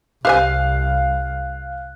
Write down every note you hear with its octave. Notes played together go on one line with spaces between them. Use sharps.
C2 G4 C5 F5 G#5 F#6